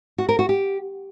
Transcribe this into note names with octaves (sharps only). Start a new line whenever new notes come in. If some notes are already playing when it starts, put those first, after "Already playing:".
F#4
A#4
F#4
G4